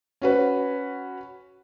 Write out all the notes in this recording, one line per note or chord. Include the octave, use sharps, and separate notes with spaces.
C#4 F#4 B4